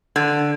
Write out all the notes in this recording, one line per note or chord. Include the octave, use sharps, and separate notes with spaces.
D3